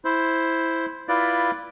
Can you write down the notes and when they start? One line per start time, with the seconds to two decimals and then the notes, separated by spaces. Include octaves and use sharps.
0.05 E4 C5
1.09 E4 F4 B4 D5